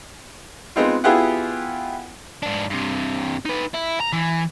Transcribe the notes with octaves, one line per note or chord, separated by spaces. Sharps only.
G#3 B3 C4 D#4 F4
B3 E4 F4 G4 G#4 F#5
G#2 D4
G2 C3
D#4 B4
E4
A#5
E3